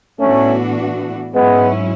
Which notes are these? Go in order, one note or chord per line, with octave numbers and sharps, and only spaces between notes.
A2 E3 A3 B3 C#4 D4 F#4
G#2 F#3 G#3 B3 C#4 E4